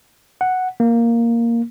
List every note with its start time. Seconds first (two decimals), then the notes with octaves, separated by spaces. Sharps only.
0.41 F#5
0.80 A#3